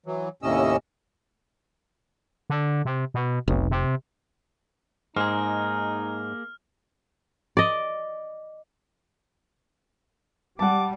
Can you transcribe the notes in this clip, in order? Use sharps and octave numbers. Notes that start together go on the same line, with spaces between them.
E3 F#3
D#2 A2 C3 C#4 D#5 E6
D3
C3
B2
F1 B1
C3
G#2 A#3 D#4 G#4 F6
D5 D#5
G3 F#5 A5 D6